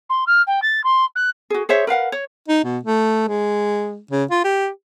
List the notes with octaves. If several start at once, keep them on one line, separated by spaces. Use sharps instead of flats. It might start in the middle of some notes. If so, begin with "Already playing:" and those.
C6
F6
G5
A6
C6
F#6
F#4 G#4
G#4 C5 C#5 E5
A#4 B4 F5 F#5
C#5
D#4
B2
A3
G#3
C#3
F4
G4